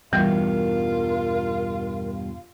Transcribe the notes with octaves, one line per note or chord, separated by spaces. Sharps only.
E2 G2 B2 E3 G3 F4 A#4